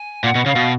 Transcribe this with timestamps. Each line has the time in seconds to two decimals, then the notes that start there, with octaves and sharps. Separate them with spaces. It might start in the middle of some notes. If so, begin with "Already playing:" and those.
Already playing: G#5
0.24 A#2 F#5
0.35 B2
0.46 C#3 F5
0.56 B2